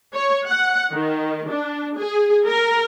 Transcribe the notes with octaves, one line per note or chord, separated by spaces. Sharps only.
C#5
F#5
D#3
D4
G#4
A#4